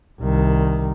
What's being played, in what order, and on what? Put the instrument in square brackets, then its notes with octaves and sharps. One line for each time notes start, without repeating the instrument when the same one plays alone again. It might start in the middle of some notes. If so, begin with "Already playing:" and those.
[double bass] C2 D#3